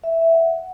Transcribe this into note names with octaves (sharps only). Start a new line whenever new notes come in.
E5
E5
F#5